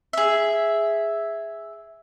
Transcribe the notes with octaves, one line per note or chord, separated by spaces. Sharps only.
G#4 E5